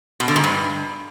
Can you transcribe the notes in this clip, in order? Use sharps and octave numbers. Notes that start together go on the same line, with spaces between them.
B2
D3
G#2
G2